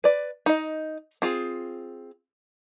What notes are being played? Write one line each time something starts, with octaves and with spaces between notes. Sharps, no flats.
B4 D5
D#4 D#5
C4 F4 G#4